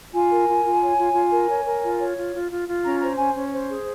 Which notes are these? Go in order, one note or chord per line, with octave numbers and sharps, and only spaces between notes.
F4 G#5
A#4
F4
F4
C#5
F4
F4
A#4
C#5
A#4
F4
C#5
F4
F4
F4
F4
C#4 A#5
C5 A#5
C#4 G#5
C#4
C5
G#4